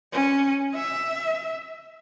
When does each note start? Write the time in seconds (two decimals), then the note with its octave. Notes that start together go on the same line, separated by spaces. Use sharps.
0.12 C#4
0.74 E5